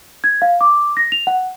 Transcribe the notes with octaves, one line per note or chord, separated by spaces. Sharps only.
G#6
F5
D6
A#6
F7
F#5